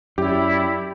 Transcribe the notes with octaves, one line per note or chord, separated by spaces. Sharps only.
F#2 E4 G4 D5 B5